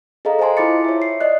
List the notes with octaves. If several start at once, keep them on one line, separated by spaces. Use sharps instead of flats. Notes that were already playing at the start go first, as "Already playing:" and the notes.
G#4 A4 D#5 F5 A#5
C5 D#5 F5 G#5 A5 C6
E4 F4 B5 D6 A6 C#7
C#5 E5
C7
D5 D#5 F#6